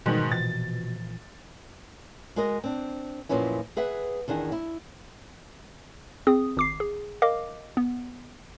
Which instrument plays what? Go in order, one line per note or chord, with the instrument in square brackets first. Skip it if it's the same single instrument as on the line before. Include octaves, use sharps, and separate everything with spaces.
[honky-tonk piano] G#2 D#3 [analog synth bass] B2 [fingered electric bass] E3 G3 G#3
[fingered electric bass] A#2 E3 F3 [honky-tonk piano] A6
[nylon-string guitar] G#3 F#4 A#4 D#5
C4 D4
F#2 A#2 F3 B3 C#4 E4
G#4 B4 E5 F#5
E2 D#3 D4 G#4 F#5
E4
[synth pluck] C4 G#4 D#6
G#1 D6 C7
G#4
A#4 D#5 F5 D6
B3